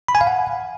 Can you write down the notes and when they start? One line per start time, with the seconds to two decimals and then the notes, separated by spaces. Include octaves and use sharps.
0.08 B5
0.15 G#5
0.21 F5
0.27 F#5